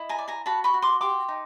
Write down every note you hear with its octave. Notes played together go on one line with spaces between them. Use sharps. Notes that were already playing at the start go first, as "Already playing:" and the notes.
Already playing: E4 D#5
G#5 A#5
D5
G#5 A#5
F#4 A5 B5
B5 C#6
F#4
C6 D6
G4 C6 D6
D#4